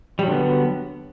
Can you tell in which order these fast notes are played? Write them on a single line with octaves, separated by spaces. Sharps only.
G3 F#3 D3 B3